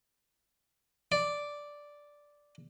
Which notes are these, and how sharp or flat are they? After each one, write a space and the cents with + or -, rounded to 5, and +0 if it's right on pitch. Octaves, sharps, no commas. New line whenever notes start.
D5 -5